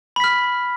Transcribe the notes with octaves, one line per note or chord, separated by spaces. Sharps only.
B5 F6 B6